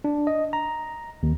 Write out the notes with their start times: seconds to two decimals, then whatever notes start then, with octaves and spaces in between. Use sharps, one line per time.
0.04 D4
0.27 D#5
0.53 A#5
1.23 D#2